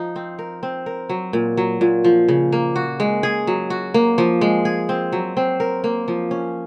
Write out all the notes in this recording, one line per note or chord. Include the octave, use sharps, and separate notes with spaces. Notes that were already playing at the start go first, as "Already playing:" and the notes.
Already playing: F3 D#4
C4
A#4
C4
A#4
F#3
A#2
F#3
A#2
F3
C#3
A#3
F#4
G#3
G#4
F#3
F#4
A#3
F3
G#3
G#4
C4
F#3
C4
A#4
A#3
F3
C#4